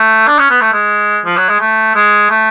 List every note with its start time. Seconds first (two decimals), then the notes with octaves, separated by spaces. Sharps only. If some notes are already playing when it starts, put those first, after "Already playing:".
Already playing: A3
0.28 D4
0.39 C#4
0.50 B3
0.61 A3
0.73 G#3
1.26 F3
1.37 F#3
1.49 G#3
1.60 A3
1.95 G#3
2.30 A3